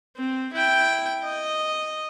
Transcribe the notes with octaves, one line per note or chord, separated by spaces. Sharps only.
C4
E4 G5
D#5